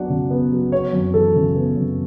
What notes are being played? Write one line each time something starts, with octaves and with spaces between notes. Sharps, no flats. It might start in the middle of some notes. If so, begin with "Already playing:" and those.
Already playing: F#3 B3 D4 D5 F#5
C#3
B3
F#3
B3 C#5
F#2
E3 A4
C#3
B3
F#2